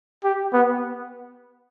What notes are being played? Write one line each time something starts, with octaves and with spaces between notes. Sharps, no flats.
G4
B3